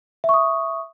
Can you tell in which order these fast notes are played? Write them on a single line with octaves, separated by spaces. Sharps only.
E5 C#6 D#6